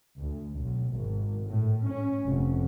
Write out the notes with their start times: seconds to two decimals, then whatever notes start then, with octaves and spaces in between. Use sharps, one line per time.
0.20 D2
0.59 B1
0.95 G#1
1.46 A2
1.86 C#4
2.25 F1